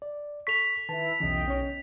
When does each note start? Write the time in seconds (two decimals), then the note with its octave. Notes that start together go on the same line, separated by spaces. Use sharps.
0.02 D5
0.47 A4 C#6 B6 F7
0.89 D#3 E4 B4 A5
1.20 B1 E2 C#3 E3 D#5 G5
1.48 C#4 C#5